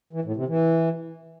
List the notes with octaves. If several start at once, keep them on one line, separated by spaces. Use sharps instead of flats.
E3
A2
C3
E3